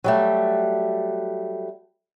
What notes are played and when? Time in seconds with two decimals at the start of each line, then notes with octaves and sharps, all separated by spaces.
0.04 F#3 G3 A3